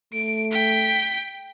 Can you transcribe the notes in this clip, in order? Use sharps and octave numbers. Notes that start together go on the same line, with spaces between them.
A3 D7
G5 B6